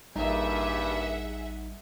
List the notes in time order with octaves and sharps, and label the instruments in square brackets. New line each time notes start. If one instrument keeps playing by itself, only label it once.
[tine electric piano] A1 G3 D#4 [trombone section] G2 A#2 [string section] G#4 E5 F#5